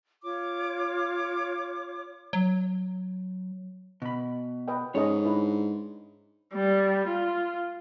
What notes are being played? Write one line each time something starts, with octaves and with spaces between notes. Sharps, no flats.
F4 C#5 D6
F#3
B2 B5
B4 D#5 G5
G#2 C#4 A4 C#5 D#5
D4 E4 B4
G3
F4